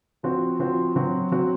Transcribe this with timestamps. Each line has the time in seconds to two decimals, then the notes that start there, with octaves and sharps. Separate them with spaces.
0.23 F3 C4 F#4
0.59 F3 C4 F#4
0.96 F#3 C4 F#4
1.32 F#3 C4 F#4